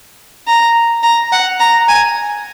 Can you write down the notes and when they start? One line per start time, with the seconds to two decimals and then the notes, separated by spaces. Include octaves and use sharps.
0.47 A#5
1.03 A#5
1.32 F#5
1.60 A#5
1.89 G#5